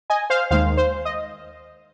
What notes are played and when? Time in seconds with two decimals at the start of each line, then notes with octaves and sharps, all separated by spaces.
0.10 D#5 G#5
0.30 C5 F5
0.51 D#2 D#3 G#3 C5 F5
0.77 C5
1.05 D#5